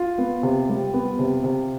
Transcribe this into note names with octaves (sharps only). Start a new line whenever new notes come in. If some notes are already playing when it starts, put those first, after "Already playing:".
Already playing: F4
B3
C3
G3
B3
C3
C3